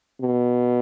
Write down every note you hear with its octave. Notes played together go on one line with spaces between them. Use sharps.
B2